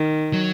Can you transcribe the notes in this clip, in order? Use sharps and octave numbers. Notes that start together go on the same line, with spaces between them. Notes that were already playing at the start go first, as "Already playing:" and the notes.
Already playing: D#3
F#3